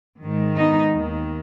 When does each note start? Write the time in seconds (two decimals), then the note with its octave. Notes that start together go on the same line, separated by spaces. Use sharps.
0.21 G#2 D#3
0.57 B3 D#4
0.92 D#2 D#3